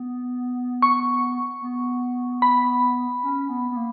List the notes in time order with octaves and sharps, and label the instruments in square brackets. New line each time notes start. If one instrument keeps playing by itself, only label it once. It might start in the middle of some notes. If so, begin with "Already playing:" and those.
Already playing: [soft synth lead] B3
[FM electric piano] C#6
[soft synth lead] B3
[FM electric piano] B5
[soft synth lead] C#4
B3
B3
A#3